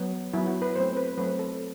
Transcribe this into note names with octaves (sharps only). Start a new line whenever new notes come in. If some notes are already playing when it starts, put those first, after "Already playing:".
Already playing: F#3 B3
F#3 B3 E4
F#4
B4
F#3 A3 C4 C5
B4
F#3 A3 C4 B4
A4